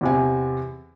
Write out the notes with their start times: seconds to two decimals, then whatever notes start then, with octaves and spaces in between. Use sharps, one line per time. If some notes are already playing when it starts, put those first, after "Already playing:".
0.01 E2 C3 G#5